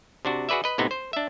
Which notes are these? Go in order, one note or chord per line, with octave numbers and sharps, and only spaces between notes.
C3 D4 F#4
F#4 G#4 B4 D5 E5
B4 D#5
A2 C3 B3 D#4
C5
D4 E5